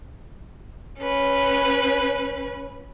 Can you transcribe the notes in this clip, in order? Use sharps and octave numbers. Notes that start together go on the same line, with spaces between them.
C#4 B4